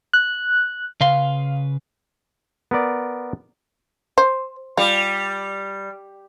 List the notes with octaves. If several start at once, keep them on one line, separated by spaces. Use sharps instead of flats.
F#6
C#3 B4 F5 C6
B3 A#4 D5
C5
G3 F4